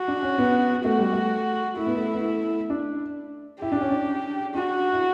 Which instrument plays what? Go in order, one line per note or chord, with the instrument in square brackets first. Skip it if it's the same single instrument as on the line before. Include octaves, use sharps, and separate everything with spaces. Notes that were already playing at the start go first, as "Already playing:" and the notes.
Already playing: [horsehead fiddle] F#4
[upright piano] D4
C#4
B3
[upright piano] A3 [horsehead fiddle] F#4
[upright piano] G3
A3
[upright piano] A3 [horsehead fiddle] E4
[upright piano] B3
A3
B3
A3
D4
[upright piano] E4 [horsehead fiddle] G4
[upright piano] D4
C#4
D4
[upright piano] D4 [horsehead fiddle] F#4
[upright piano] E4